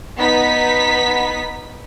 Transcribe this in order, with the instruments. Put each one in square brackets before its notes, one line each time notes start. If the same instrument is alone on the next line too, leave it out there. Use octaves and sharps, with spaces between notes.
[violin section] B3 D#4 B6